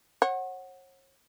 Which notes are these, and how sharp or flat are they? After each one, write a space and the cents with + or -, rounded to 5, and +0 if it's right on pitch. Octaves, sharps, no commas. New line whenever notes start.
C#5 -40 F#5 +0